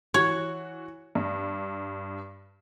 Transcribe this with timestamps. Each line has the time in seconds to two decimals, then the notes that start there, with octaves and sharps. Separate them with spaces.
0.14 E3 F#4 C#5
1.15 G2